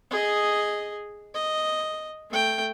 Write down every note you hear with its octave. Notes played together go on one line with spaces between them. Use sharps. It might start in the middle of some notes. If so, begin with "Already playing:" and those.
G#4 D#5
D#5
A3 G5